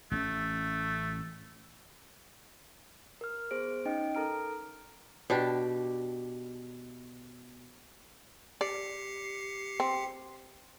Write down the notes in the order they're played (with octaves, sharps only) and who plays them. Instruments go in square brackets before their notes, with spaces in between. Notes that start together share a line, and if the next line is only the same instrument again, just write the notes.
[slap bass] A1 C4 C#4 [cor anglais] A3
[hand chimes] A#4 F6
B3 G#4 C5 D7
C#4 D#4 D#5 G5 D7
A4 A#4 A#5 F6 D7
[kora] B2 D4 G4
[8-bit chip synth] G4 C7 C#7 [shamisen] D5
[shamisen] C4